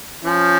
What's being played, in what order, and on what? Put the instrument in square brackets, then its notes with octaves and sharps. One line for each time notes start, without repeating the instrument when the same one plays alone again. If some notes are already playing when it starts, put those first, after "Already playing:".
[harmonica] F3 [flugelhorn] C#4